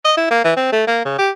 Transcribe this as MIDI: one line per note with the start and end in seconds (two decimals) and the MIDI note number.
0.05 0.14 75
0.17 0.27 64
0.31 0.41 58
0.44 0.53 52
0.56 0.70 60
0.72 0.83 57
0.87 1.00 58
1.05 1.16 49
1.19 1.30 67